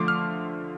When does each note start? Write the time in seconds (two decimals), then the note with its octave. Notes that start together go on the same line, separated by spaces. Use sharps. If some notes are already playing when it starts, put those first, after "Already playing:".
Already playing: D3 F3 A3 C6 D6
0.08 F6